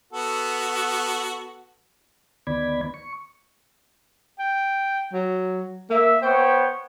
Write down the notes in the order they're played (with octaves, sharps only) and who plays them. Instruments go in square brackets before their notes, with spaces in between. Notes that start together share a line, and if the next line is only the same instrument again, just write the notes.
[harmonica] B3 F#4 A4
[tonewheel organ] D2 D#3 B3 D5 B5 G#6
C#6
[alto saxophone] G5
F#3
[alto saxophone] A#3 [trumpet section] E5
[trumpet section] B3 C#5 G5 [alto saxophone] C5